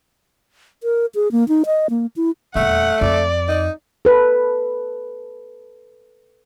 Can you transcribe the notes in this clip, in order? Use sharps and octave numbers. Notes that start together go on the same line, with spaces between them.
A#4
G#4
A#3
D#4
D#5
A#3
E4
D#1 E2 A3 F#5
F2 D5
D#4
A4 B4